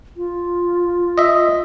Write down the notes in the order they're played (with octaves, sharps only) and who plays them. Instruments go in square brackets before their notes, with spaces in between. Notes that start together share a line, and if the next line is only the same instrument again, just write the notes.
[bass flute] F4
[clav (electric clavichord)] D#5 E5